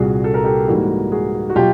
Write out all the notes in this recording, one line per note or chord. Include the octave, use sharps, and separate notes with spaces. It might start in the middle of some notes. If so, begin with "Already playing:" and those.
Already playing: C2 A#2 G3 F#4 G#4
A4
A#4
G4 A4
G#2 E3 G3 A#3 F#4
F#4 G#4
F#4
B2 F#3 F4 G4